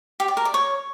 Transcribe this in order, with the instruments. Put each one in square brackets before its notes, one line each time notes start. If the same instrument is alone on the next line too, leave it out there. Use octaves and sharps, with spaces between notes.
[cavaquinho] G4
D5
A#4
D5
C#5